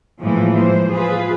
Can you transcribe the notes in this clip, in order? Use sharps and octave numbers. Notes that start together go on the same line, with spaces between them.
A2 E3 F3 G#3 A#3
C5
F4 G#4 B4